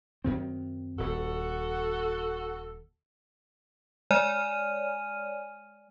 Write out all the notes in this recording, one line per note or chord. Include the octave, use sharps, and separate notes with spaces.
F#2 D#3 C4
D#1 F#4 A4
G#3 C#5 D5 G#5 F6 D#7